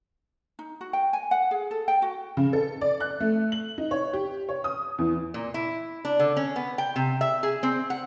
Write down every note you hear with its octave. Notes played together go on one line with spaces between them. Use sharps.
D#4
F#4
G5
G#5
F#5
G#4
A4
G5
F#4
C#3
A4
D5
F#6
A3
F#7
D#4
C#5
G4
C#5
D#6
E2
A#2
E4
D4
D3
C#4
B3
G5
C3
E5
G#4
C4
F#5